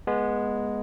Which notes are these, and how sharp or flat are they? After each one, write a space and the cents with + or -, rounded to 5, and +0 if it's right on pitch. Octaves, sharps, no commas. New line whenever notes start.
G#3 +0 B3 -20